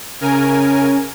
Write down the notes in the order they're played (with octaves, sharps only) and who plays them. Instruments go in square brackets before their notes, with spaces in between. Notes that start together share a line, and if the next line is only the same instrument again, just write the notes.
[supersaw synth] C#3 A#4 G#5 [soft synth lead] C#4